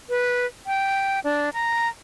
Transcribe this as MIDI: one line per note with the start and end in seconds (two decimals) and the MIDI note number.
0.09 0.46 71
0.66 1.20 79
1.24 1.49 62
1.53 1.88 82